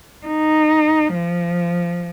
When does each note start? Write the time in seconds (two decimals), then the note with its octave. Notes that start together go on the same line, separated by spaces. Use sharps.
0.26 D#4
1.13 F3